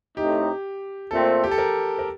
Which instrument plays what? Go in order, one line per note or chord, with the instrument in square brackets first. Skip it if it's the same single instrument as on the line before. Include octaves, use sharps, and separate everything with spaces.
[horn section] A2 A3 C4 D#4 [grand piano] G4
[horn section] A#2 A3 C4 [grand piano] A4
[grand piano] G4
A4
A#4
A#4